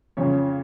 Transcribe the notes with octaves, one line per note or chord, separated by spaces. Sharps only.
F2 C#3 F3 C#5